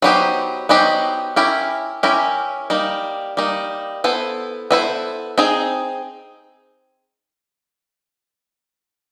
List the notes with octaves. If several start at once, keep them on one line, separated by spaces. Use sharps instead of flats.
F#3 B3 D#4 G4 C5
F#3 B3 D#4 G4 C5
C#4 E4 G4 A#4
C#4 E4 G4 A#4
G3 A#3 D#4
G3 A#3 D#4
B3 E4 A4 C5
B3 E4 A4 C5
C4 D#4 G#4